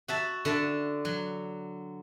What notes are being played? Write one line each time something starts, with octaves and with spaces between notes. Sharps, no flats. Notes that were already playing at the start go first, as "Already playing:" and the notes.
F#4 E5 A5
D3 E5 A5
F#3